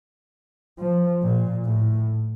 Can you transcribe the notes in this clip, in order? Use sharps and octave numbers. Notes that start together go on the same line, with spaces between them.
F3
A#2
A2